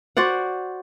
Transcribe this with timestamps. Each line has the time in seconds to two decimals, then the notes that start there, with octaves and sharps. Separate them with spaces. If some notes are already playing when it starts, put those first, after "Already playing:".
0.17 F#4 C5 D5 F#5